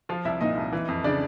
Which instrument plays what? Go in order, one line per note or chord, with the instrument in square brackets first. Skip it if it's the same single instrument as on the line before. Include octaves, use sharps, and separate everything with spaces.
[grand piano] F3 F4 F5
C2 E4 E5
A#2 D#4 D#5
C2
E3
F2
C#3 D4 D5